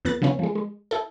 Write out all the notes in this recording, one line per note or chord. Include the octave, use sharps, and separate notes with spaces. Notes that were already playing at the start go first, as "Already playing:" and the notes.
F2 B3 F#6 A6
C#3 F3 B3 C#4
F3 G#3
G#3
E4 A4